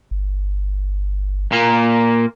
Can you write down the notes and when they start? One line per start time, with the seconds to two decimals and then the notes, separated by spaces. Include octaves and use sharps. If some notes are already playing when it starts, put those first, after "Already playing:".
0.11 G1
1.52 A#2 A#3